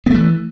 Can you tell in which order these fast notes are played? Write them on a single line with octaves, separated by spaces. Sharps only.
B3 A3 E3